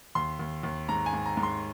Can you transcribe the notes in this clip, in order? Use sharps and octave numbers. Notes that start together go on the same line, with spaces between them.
D#2 C6
D#2
D#2
G#2 A#5
G#5
G#2
A#5
G#2
C6